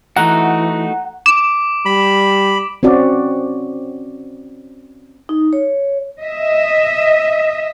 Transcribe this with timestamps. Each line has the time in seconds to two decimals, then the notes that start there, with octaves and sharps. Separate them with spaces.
0.16 E3 A3 D#4 F#4 F#5 A#5
1.26 D6 D7 E7
1.86 G3 B5
2.83 C4 C#4 F#4 D5
5.29 D#4
5.53 C#5
6.21 D#5 E5